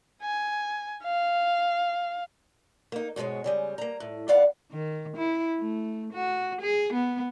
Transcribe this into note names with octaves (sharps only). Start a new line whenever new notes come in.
G#5
F5
A#3 D#4
G#2 B2 F3 G#3 C#5
C#3 G3 G#3
A#3 A#5
A2
F2 B3 D5 F5 F#5
D#3
E4
A3
F#4
G#4
B3